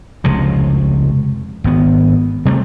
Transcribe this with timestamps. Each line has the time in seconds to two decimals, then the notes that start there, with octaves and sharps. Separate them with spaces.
0.24 F1 C#2 A2 C3
1.64 G#1 B3
2.45 C3 G3 A3